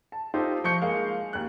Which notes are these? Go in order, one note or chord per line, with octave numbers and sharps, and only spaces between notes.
A5
D#4 F4 G4 A4 C5
F3 C#6 G6 C#7
G#3 A#3 F5
D#2 F#6